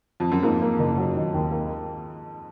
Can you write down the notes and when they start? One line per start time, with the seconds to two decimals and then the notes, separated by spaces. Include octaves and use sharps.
0.20 F2
0.32 F#2
0.43 F2 G#2 A#3
0.62 A#3
0.79 F#1
0.97 F#3
1.15 D#3
1.34 D#2
1.52 A#3